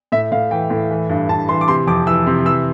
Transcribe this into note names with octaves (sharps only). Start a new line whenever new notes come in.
A2 E5
A2 F5
E3 G5
A2
E3
G2
G2 A5
E3 C6
D6
C3 C6
F2 D6
E3 E6
C3
E3 E6